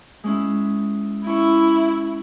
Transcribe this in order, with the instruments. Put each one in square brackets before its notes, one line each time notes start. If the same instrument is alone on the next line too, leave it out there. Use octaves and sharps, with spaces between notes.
[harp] G#3 C#4 E4
[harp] C#4 C#6 [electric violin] E4